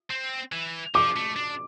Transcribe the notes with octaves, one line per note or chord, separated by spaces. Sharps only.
C4
E3
F3 D6
A3
D4